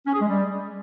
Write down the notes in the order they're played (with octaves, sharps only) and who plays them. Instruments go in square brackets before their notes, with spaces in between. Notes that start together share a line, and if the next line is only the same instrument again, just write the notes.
[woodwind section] C#4
G#4
G#3
G3